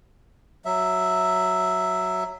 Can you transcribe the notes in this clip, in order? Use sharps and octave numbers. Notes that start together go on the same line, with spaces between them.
F#3 E5